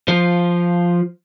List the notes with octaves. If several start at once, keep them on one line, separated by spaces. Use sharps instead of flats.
F3 F4 C5